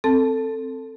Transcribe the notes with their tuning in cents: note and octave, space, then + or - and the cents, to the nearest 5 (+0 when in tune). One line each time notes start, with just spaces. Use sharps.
C4 +0 A4 +15 A5 +0